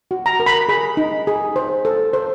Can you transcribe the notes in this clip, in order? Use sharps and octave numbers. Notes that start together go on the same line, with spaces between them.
F#4
A#5
A#4
B5
G#4 B5
D#4
G#4
C5
A4
C5